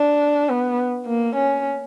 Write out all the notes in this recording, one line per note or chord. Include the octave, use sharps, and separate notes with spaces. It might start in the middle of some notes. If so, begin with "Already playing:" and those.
Already playing: D4
B3
A#3
C#4